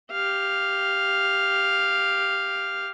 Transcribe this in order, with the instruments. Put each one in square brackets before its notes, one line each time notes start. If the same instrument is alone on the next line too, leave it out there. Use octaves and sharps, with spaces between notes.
[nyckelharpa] G4 F5